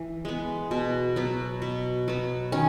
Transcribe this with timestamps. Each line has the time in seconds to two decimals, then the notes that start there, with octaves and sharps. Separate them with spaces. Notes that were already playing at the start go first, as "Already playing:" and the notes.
Already playing: E3
0.25 G#3 B3
0.71 B2
1.16 F#3 B3
1.62 B2
2.08 F#3 B3
2.52 D#3 C#4